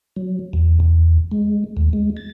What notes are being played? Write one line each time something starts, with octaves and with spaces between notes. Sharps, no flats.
F#3
E2
E2
G#3
D#2
G#3
A6